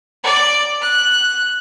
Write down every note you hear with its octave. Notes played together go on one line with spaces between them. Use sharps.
D5
F#6